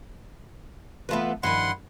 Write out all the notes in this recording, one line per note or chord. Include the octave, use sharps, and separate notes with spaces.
E3 A3 B3 F4 B4 E5
G2 D#3 F3 E4 B4 F#5 C6